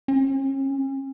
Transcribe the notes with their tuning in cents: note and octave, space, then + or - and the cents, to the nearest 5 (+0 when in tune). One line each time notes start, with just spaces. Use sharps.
C#4 -40